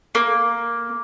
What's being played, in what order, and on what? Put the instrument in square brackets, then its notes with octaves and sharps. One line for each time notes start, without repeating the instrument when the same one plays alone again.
[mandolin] A#3